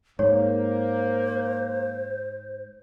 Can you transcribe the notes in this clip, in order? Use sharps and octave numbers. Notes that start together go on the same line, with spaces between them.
G#2 A#3 C5 C#5